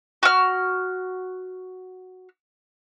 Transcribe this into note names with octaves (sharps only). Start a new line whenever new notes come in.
F#4 F6